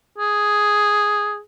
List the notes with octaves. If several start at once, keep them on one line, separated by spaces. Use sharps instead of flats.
G#4